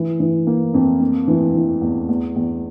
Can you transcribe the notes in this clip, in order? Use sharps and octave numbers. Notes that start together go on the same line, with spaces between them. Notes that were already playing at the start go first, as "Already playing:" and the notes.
Already playing: E3
E3
A#3
F2
A#3
E3
E3
E2
E2
E2